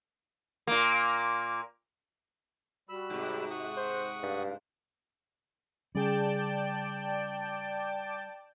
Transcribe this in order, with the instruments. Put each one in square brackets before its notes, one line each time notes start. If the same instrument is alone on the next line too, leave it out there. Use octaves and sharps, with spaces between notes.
[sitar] A#2 A#3
[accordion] G3 B5 E6 [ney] F#4
[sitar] G#2 C3
[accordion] F#5 C#6 D#6
[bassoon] C5
[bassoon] G2 [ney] F5
[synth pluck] C#3 G#4 [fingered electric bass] G3 [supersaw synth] D5 G5 A5